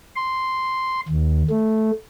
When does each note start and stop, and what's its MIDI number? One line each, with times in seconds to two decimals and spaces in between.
0.16 1.00 84
1.09 1.43 39
1.50 1.91 57